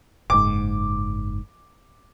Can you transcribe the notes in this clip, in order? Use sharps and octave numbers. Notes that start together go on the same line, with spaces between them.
F#1 G#2 D6